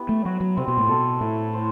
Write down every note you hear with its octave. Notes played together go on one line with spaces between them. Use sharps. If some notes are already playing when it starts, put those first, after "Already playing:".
Already playing: B3 E4 G4
A3
F#3 F#4
F#3
C3 C4
B2
A2
B2 A4
A2 E4
C5